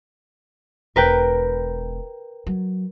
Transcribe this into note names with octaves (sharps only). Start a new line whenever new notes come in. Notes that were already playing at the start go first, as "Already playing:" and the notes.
E1 A#4 B4 G5
F#3